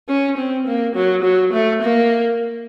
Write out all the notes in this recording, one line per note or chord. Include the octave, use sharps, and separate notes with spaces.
C#4
C4
A#3
F#3
F#3
A3
A#3